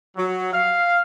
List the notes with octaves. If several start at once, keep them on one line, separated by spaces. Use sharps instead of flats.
F#3
F5